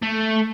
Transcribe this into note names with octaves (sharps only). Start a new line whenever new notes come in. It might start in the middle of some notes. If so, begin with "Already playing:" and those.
A3